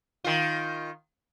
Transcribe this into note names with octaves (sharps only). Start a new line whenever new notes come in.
D#3 F4